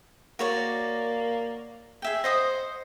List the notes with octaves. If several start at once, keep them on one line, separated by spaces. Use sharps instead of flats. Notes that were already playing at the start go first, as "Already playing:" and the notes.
A#3 F#4 C#5 D5
G#4 E5 G5
C5 D#5 F#5 D#6